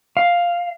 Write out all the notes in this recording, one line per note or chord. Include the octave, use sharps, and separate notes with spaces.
F5